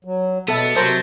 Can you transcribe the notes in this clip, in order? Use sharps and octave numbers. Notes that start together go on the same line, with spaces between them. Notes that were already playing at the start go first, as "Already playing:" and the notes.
F#3
B2 B3 A4 E5 A6
C3 F#3 A#4 C5 A5 G6 A#6 D7